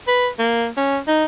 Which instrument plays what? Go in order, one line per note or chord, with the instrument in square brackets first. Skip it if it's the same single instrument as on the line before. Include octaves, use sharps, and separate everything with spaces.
[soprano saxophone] B4
A#3
C#4
D#4